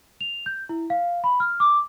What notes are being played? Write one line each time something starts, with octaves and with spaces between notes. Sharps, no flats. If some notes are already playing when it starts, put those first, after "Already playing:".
F7
G6
E4
F5
B5
F6
D6